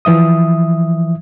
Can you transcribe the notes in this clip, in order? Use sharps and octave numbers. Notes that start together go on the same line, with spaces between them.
E3 F3 E5 D#6